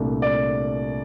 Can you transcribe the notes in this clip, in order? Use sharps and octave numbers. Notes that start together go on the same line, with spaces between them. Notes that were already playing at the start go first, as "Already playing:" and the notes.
Already playing: C2 A#2 A3 D4
D5